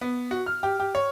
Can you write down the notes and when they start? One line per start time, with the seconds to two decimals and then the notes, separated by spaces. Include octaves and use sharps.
0.01 B3
0.31 F#4
0.46 F6
0.63 G4
0.80 G4
0.95 C#5